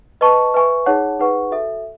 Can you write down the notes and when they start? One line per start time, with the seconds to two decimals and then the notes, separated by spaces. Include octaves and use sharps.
0.21 B4 D#5 A5 C#6
0.54 B4 E5 G#5 C#6
0.86 D#4 G#4 C#5 F#5 A5
1.19 D#4 G#4 B4 F#5 C#6
1.51 F#4 A4 E5